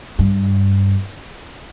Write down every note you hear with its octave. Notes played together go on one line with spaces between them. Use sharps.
G2